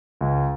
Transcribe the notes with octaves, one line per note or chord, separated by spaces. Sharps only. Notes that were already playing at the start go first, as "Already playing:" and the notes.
C#2